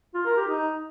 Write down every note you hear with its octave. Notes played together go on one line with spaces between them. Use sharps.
F4
A#4
G4
D#4